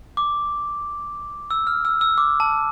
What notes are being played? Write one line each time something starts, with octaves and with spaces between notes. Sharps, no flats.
D6
E6
F6
E6
E6
D6
A5